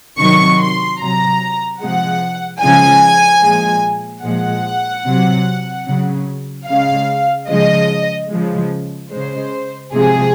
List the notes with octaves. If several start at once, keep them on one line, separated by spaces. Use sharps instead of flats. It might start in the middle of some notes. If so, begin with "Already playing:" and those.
C3 D#3 F#3 C#6
C6
C3 F#3 A#5
C3 F3 G#3 F#5
C#3 F3 G#3 G#5
A#2 F3 G#3
A#2 F3 G#3 F#5
C3 F#3
C#3 F#3
C#3 G#3 F5
C#3 F3 G#3 D#5
C#3 F3 G#3
C#3 G#3 C5
C3 F3 G#3 G#4